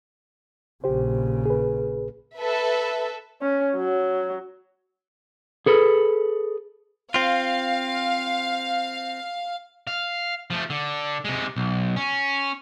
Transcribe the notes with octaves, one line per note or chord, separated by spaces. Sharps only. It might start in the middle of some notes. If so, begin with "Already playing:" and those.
A#1 C#3 G4 C5
G#4 B4
A4 B4 E5
C#4
F#3
G#4 A4 B4
C4 F4 F5
F5
F3 A3
D3
C3 G#3
B1
C#4